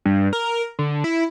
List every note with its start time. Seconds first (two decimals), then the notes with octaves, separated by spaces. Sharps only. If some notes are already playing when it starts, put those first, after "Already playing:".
0.05 G2
0.33 A#4
0.79 D3
1.04 E4